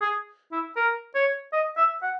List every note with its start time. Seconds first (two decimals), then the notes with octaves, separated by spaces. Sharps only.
0.01 G#4
0.52 E4
0.76 A#4
1.15 C#5
1.53 D#5
1.77 E5
2.03 F#5